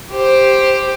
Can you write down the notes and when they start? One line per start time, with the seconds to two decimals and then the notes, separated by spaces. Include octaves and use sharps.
0.11 G4 C5